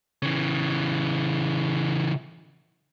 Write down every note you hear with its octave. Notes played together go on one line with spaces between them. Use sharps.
C#3 E3